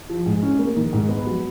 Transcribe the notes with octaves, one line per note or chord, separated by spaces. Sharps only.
F3
G#2
C#4
A#3
D#3
G#2
B3
F#3